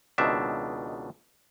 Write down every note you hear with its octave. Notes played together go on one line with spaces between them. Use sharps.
C#2 B2 D#3 C4 D4 E5